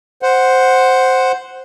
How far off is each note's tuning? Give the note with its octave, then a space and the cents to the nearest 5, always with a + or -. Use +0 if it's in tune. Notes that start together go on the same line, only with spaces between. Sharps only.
C5 +0 F#5 +0